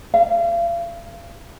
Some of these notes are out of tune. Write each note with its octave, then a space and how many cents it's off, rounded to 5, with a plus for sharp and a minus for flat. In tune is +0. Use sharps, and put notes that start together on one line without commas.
F5 -40